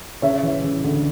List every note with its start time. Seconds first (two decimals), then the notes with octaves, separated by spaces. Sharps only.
0.22 C#3 C#5 E5
0.43 E3
0.64 C#3
0.84 D2